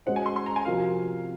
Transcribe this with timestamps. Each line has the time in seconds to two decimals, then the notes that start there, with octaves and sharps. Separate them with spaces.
0.06 G#3 C#4 F#4 C5 D#5 F#5
0.16 G#5
0.26 C6
0.36 C6
0.46 A#5
0.56 G#5
0.65 C3 F3 C4 F#4 A#4 F5